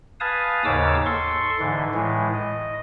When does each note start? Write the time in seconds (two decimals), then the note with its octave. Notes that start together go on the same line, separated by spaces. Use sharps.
0.20 B4 F5 G#5 A5 D#6
0.65 D#2 G#2 C#3 C#5 D6 E6
1.06 A4 C6 C#6
1.59 G#2 D3 E3
1.94 A2 E3 G#3
2.34 D#5